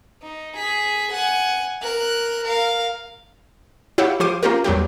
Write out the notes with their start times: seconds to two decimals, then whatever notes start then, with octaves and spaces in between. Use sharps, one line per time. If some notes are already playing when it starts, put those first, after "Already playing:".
0.23 D#4
0.57 G#4 B6
1.12 F#5 G#5
1.82 A#4 F#6
2.45 A#4 F5
3.98 E4 F#4 G4 C#5 F5 F#5
4.20 F3 F4 G4 C5 D6 D#7
4.43 A#3 C#4 F4 G4 A#4
4.64 E2 F#3 G3 G4